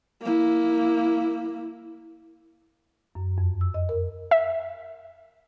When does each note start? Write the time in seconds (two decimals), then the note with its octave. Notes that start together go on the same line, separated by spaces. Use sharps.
0.21 A#3 E4
3.15 F#2
3.38 F2
3.61 E6
3.74 D#5
3.89 A#4
4.31 E5